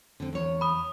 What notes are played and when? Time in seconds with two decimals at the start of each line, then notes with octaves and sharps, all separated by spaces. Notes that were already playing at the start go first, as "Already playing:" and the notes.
0.20 D3 C4
0.33 E2 C#5
0.61 B5 D#6